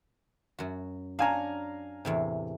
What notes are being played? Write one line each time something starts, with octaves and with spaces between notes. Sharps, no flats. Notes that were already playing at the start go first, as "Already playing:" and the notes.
F#2 F#4
D4 C#5 F5 G#5 A#5
E2 A2 C3